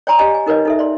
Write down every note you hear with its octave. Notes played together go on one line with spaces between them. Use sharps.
C#5 D5 G#5 A#5 C6 C#6
G4 C#5 D#5 G#5
G#5
D#4 A#4 B4 C#5 D#5
D#4 A4 E5
D5 C6